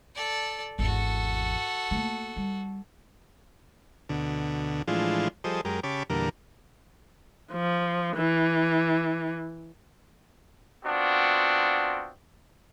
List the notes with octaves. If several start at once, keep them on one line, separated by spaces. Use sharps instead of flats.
A4 D5
G#1 E2 F#4 A4
A3 A#3
G3
D2 B2 D3
A2 E3 F3 G#3 D4 F4
F3 G3 G#4 A4 C5 D#5
F#2 G#3 G4 A#4
C#3 G4 C#5 A5 B5 D6
E2 A#2 D3 G3 A#4
F3
E3
B3 C4 D4 F4 F#4